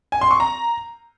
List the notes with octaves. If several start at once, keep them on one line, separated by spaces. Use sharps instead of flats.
G#5
C6
C#6
A#5